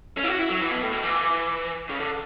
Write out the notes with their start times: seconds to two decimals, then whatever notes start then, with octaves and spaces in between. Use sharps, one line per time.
0.17 C#4
0.23 E4
0.28 F#4
0.39 E4
0.49 F#3
0.60 E3
0.71 B2
0.82 A2
0.92 B2
1.03 E3
1.89 C#3
2.00 D3